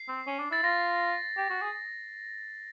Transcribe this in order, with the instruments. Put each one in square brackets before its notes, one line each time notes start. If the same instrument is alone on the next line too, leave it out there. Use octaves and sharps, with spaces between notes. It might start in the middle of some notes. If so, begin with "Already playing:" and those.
Already playing: [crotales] C7
[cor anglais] C4
C#4
D4
[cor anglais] E4 [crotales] A6
[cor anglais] F4 [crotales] A#6
[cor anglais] G4
F#4
G#4